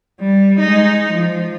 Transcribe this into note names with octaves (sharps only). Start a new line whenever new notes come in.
G3
G#3 D#4
F3